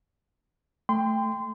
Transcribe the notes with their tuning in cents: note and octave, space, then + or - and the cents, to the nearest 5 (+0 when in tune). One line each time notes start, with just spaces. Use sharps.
A3 +0 G5 +20 C6 -25